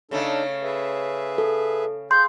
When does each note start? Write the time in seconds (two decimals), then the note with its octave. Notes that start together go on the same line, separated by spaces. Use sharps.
0.11 C#3 A3 D4 D#4 A4
0.63 G#4 B4 E5
1.38 A4
2.11 G#4 F5 C6 G6